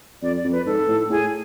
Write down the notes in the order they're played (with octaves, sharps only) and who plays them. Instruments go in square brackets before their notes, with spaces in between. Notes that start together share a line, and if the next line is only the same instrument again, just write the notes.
[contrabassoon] F2 [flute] D5
[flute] D5
[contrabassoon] F2
[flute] B4
[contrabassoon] G#2 [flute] A4
[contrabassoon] A2
[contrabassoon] A2 [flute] G#4